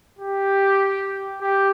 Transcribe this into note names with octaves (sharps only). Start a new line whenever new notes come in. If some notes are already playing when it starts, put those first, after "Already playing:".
G4
G4